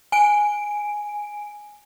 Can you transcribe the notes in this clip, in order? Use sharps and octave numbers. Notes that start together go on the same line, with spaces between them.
G#5 D7